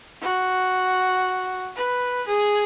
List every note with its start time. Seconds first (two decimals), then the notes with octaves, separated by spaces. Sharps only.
0.22 F#4
1.76 B4
2.27 G#4